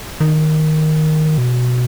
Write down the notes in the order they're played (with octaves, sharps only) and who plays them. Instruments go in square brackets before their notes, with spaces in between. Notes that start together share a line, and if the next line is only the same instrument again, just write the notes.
[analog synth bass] D#3
B2